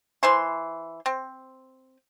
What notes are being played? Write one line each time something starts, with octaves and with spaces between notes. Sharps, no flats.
E3 C5 C6
C4